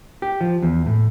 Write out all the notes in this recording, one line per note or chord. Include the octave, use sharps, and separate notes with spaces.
G4
F3
E2
A2